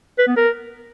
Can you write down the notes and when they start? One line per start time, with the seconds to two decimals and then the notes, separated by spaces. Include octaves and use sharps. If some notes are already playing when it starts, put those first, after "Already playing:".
0.18 B4
0.28 B3
0.37 A#4